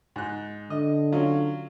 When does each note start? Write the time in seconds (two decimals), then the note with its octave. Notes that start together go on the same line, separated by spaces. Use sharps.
0.16 G#2 F#6
0.70 D3 D#5
1.12 F#3 C#4 F4